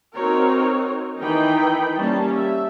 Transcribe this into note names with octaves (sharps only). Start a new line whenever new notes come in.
C4 D#4 F#4 A#4 C#5
D#3 E3 D#4 G5 B5
G3 A#3 C#4 A5
E5